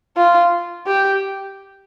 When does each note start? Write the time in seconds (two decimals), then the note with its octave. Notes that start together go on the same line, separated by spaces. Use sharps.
0.17 F4
0.87 G4